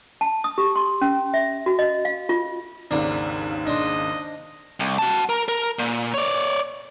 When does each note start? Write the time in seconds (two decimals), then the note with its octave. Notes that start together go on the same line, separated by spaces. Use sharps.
0.21 A5
0.44 D#6
0.58 G4
0.76 C6
1.01 C#4
1.34 E5
1.66 F#4
1.79 D#5
2.05 F5
2.29 F4
2.91 G#1 D#2 C#3 D4 A#4
3.67 D4 C5 D#5
4.80 C2
4.98 F#4 A5
5.29 A#4
5.48 A#4
5.79 A#2
6.14 C#5 D5